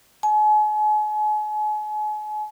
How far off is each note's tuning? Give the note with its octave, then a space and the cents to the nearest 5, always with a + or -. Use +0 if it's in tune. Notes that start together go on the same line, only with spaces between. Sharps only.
G#5 +40